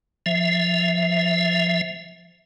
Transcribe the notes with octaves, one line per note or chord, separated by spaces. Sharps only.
F3 E5